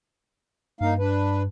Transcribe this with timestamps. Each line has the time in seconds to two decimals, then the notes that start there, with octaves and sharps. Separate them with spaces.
0.81 G2 A#3 D#4 F5
0.99 D4 B4